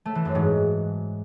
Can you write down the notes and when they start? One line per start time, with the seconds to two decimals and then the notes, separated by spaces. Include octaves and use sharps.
0.05 A3
0.15 E3
0.25 F#2
0.35 G#2